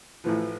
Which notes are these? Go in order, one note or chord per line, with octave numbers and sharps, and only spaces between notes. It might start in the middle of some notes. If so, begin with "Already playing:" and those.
A1 A2 F3 B4